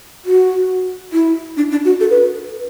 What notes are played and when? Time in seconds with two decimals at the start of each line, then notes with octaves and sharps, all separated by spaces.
0.25 F#4
1.13 E4
1.57 D4
1.71 D4
1.85 F#4
2.01 A4
2.10 B4